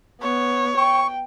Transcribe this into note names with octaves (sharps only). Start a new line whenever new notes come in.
B3 C#5
G5 C#6